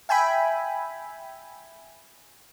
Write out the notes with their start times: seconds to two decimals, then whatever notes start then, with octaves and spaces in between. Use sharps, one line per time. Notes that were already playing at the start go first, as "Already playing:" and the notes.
0.09 E5 G5 G#5 B5